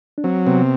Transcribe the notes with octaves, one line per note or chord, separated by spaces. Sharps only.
D4
F#3 C4
C3 B3